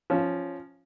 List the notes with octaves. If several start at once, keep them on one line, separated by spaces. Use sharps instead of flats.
F3 C#4